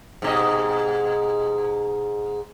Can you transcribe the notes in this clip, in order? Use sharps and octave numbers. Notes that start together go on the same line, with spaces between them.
G#2 B2 D#5